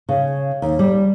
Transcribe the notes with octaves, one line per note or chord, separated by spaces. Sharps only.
C#3
D#2
G3